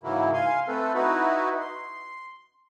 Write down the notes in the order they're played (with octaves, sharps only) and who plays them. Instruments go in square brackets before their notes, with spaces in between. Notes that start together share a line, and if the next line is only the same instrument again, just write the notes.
[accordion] G#2 C#3 E3 F#3 A#3 E4
F5 G#5 C6
A3 C4 A4 B4
D#4 E4 F#4 B4
C6